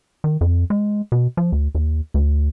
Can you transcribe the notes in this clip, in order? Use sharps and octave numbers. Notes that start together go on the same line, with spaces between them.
D#3
F2
G#3
B2
F3
D2
D#2
D2